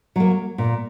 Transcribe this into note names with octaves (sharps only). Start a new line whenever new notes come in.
F#3 A#3
A#2